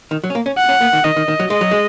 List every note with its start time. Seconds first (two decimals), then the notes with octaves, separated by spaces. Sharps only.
0.11 D#3
0.24 F#3
0.30 C#4
0.35 A#3
0.46 C#4
0.58 F#5
0.69 C#4
0.81 A#3
0.93 D#3
1.04 D#3 D#5
1.16 D#3
1.28 D#3
1.40 F#3
1.50 G#3 D#5
1.61 F#3
1.71 G#3